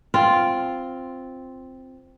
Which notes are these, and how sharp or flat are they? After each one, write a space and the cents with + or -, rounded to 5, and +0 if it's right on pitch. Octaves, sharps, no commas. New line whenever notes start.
C4 +0 F4 +0